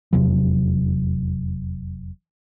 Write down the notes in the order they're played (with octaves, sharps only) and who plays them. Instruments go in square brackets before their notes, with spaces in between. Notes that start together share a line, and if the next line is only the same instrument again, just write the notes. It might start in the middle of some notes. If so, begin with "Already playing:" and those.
[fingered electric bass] F1 E2 C3 F#3